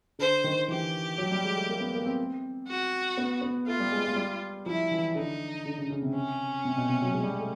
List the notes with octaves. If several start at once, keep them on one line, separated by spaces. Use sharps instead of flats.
D3 C5
D#3
E3 G4
F#3
G3
G#3
A3
A#3
B3
A#3
C4
F#4
B3
B3
A3 F4
G3
G#3
G#3
G3
F3 E4
E3
D3 D#4
D3
C#3
C#3
C3
C#4
C3
B2
C3
F#3
G#3
G3
G#3
A3